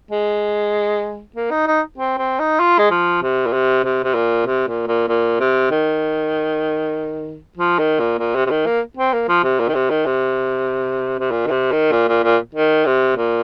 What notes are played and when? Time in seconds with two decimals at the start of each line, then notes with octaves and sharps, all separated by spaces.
0.11 G#3
1.36 A#3
1.51 D#4
1.67 D#4
1.98 C4
2.18 C4
2.39 D#4
2.60 F4
2.79 G#3
2.91 F3
3.22 C3
3.47 A#2
3.53 C3
3.84 C3
4.04 C3
4.15 A#2
4.46 C3
4.67 A#2
4.87 A#2
5.08 A#2
5.40 C3
5.71 D#3
7.57 F3
7.79 D#3
7.99 A#2
8.19 A#2
8.36 C3
8.46 C3
8.51 D#3
8.66 A#3
8.97 C4
9.13 A#3
9.28 F3
9.44 C3
9.60 A#2
9.68 D#3
9.75 C3
9.90 D#3
10.06 C3
11.19 C3
11.31 A#2
11.47 D#3
11.51 C3
11.72 D#3
11.92 A#2
12.08 A#2
12.24 A#2
12.55 D#3
12.86 C3
13.17 A#2